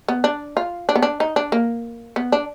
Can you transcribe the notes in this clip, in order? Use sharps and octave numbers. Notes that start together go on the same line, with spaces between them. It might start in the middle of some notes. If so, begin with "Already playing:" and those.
B3
D4
F4
D4
B3
D4
D#4
D4
A#3
B3
D4